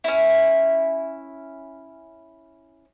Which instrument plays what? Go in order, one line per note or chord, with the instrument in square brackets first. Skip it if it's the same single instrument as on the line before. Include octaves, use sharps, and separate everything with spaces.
[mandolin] C#4 E4